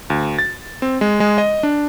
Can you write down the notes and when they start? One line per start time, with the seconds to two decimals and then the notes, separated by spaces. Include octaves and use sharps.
0.10 D2
0.39 A6
0.82 C4
1.01 G#3
1.20 G#3
1.38 D#5
1.63 D4